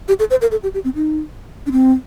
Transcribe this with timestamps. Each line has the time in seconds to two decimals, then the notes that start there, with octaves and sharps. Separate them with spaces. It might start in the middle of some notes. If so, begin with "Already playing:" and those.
0.08 G4
0.19 A4
0.30 C5
0.42 A#4
0.51 A4
0.63 G4
0.74 G4
0.85 C4
0.95 D#4
1.66 D4
1.72 C4